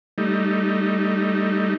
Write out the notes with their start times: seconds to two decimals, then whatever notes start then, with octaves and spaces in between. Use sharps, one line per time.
0.18 G3 A3 D#4